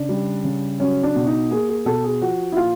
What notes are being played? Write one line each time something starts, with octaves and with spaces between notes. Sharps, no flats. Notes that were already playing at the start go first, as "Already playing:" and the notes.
Already playing: C#3 D4
G3
C#3
F#3 C#4
D4
B2
D#4
A#3 G#4
G#4
B2 A4
G#4
F3 F#4
E4
A#2 F4